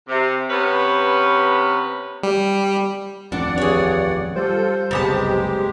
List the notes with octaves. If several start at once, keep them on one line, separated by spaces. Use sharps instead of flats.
C3
C3 B3 C#4 B4
G3
D#1 A1 F2 D4 D5 F#5
G2 G#4 C#5
G3 F4 A4 C5
F#1 C2 A#2 G#3 B3 G4 A5